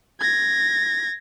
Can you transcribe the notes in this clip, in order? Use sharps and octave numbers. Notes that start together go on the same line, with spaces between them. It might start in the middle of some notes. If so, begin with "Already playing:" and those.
G#6 A#6